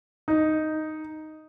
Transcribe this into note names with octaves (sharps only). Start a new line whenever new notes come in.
D#4